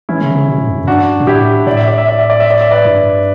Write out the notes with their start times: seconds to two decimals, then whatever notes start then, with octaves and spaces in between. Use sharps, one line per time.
0.09 E3 C#4 E4
0.21 C#3
0.35 C#3
0.48 B2
0.58 A2
0.67 F#2
0.78 F#2
0.87 G2 D4 F#4
1.20 B2
1.27 A2 E4 G4
1.67 A2 D5
1.77 E5
1.88 D5
1.98 E5
2.09 D5
2.19 E5
2.30 D5
2.40 E5
2.51 D5
2.61 E5
2.71 B4 D5
2.85 G2